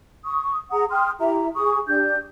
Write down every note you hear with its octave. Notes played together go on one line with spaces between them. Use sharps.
C#6 D#6
G#4 F#5 A#5 D#6
G5 C6 D#6 F6
E4 G4 E5 A#5
G#4 C#6 D#6
D4 G4 G6